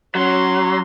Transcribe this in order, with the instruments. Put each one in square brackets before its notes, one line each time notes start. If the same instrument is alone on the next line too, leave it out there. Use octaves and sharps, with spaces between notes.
[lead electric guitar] F#3 [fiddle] C#4 C6